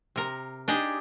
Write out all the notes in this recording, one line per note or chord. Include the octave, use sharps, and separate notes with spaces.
C3 A#4
D4 D#4 G4 G#4 D#5